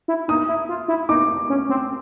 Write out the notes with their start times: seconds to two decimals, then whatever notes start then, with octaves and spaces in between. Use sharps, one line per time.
0.08 E4
0.28 D#4 D#6
0.48 E4
0.69 F4
0.88 E4
1.09 D#4 D6
1.50 C#4
1.69 C4